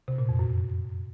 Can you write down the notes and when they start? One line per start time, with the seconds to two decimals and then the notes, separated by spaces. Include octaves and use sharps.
0.08 C3
0.18 A#2
0.29 F2
0.39 F#2